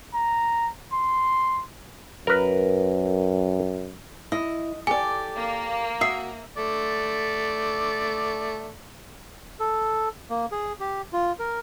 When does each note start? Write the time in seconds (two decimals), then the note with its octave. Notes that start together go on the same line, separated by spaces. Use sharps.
0.14 A#5
0.93 C6
2.27 F#2 A#4 B4
4.32 E4 D#5
4.87 G4 A4 D5 G#5
5.36 A#3
6.01 F#4 E5 D#6 C7
6.57 A3 D5
9.60 A4
10.30 A#3
10.52 G#4
10.80 G4
11.13 F4
11.39 A#4